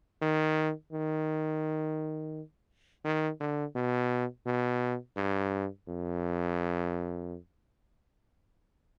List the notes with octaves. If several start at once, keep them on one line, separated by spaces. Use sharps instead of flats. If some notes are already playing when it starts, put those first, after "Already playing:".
D#3
D#3
D#3
D3
B2
B2
G2
F2